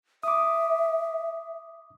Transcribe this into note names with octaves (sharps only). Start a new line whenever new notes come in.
E5 D6 D#6